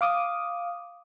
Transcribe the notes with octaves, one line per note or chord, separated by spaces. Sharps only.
F5 D6 D#6